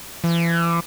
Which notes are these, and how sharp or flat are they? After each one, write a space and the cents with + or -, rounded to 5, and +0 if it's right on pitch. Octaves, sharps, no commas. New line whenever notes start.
E3 +40